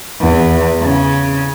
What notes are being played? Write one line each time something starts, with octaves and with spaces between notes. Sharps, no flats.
E2
C#3